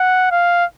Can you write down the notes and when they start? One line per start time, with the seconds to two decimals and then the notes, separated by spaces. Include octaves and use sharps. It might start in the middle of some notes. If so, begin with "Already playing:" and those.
Already playing: F#5
0.32 F5